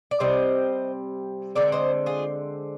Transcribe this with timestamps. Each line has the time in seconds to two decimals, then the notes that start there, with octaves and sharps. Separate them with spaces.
0.11 D5
0.20 C3 G3 C4 C5 D#5
1.55 D3 G#3 C4 A#4 D5
1.72 C5 D#5
2.06 F4 G#4